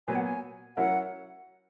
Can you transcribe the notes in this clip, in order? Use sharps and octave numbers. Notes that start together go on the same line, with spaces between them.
A#2 F#3 B3 G#5
F#5
G#5
F#3 C#4 E4 A#4 F#5